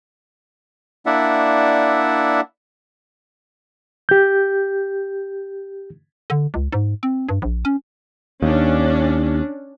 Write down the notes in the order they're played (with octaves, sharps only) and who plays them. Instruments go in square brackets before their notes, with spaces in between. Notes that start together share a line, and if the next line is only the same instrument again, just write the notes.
[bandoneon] A#3 D4 E4 D5 E5 F#5
[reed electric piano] G4 G6
[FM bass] D3
C#2
G#2
C4
G2
A#1
C#4
[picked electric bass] D#2 [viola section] C#4 D4